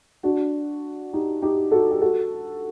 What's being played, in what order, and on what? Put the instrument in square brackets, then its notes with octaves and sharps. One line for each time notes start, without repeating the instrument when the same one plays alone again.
[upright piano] D4 F#4
D#4 G4
D#4 G4
F#4 A4
G4
F#4 A4